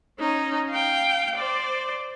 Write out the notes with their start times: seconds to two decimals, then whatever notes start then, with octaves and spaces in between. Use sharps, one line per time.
0.19 C#4 D#4
0.70 F5 G5
1.36 C5 D5